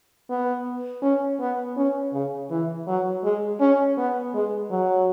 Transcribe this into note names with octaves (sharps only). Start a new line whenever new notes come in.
B3
C#4
B3
C#4
C#3
E3
F#3
G#3
C#4
B3
G#3
F#3